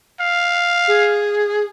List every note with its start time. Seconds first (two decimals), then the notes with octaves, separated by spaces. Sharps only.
0.20 F5
0.87 G#4